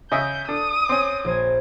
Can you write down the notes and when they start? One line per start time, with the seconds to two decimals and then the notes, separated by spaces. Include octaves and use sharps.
0.12 C#3 D#5 E5 G6
0.48 D4 A4 D#6
0.89 C4 C#4
1.25 A#1 C5 G#6